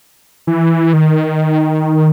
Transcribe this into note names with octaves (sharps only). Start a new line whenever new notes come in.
E3
D#3